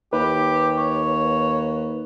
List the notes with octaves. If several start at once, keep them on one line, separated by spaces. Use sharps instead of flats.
D#2 G4 B4
C#5